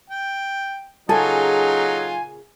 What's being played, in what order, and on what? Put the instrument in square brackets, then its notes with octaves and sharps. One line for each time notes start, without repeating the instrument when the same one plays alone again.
[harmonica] G5
[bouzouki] A#2 C#3 G#4 [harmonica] F#3 D#4 F4 [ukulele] A4 [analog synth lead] G#5